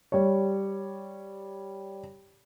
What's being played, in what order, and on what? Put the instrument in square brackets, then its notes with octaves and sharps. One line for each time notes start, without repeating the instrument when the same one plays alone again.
[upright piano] G3 C#5